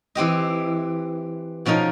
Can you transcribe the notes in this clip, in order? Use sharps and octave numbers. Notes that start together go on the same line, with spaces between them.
E3 C4 G4 D#5
B2 F3 C#4 D#4 A#4